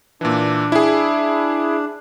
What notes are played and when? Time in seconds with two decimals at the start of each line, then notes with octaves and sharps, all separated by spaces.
0.21 A#2 E3 D4
0.72 E4 G#4